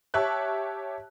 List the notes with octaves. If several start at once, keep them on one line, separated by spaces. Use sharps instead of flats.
G4 C#5 E5 A5 F#6